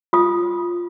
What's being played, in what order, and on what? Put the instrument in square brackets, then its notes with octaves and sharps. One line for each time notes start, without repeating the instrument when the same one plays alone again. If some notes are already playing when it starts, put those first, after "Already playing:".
[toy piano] F4 D#6